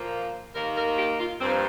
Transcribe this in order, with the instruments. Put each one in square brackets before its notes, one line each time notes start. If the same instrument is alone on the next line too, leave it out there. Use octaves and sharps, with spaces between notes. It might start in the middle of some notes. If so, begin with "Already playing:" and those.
Already playing: [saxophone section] A#2 F3 A#3
D#2 D#3 A#3 A#4
A#4
G4
F4
G2 F3 A#3 C4